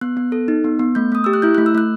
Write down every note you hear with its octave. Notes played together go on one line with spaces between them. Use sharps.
B3 F#6
B3
A4
D#4
B3
B3
A3 G6
A3 D#6
G4 E6
F#6
E4 G6
A3 F#6
E6
A3 F#6